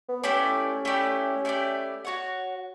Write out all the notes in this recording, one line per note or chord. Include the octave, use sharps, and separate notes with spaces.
B3
A3 C#4 E4 G4 D5
A3 E4 G4 D5
A3 E4 G4 D5
F#4 C#5 F#5